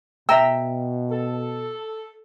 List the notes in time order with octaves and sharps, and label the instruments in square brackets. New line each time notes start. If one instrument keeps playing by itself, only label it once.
[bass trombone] B2 [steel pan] E5 A#5 E6 [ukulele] G5
[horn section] A4